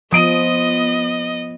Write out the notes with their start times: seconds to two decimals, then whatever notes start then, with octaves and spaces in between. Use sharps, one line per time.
0.13 F3 B3 D#5 D#6 D7 D#7